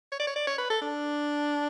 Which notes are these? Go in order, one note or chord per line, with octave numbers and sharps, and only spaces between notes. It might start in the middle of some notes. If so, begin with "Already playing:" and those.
C#5
D5
C#5
D5
C#5
B4
A4
D4